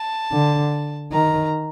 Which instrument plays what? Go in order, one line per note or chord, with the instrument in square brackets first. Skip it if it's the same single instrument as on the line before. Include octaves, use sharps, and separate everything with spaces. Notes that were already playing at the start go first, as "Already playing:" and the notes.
Already playing: [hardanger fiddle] A5
[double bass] D3
[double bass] D#3 [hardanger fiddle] A#5